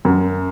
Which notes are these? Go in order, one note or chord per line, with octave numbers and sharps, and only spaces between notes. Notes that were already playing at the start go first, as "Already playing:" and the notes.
F#2